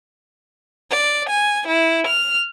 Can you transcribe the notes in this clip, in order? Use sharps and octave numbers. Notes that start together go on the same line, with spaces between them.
D5
G#5
E4
F6